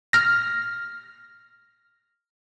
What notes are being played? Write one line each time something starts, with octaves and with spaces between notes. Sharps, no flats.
F6 A#6